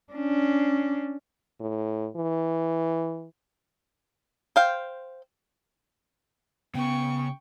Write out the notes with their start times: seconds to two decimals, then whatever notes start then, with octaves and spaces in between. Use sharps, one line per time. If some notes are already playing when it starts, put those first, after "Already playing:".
0.13 C#4 D4
1.61 A2
2.16 E3
4.56 C5 F5 G5
6.75 C#3 B3 G5 C#6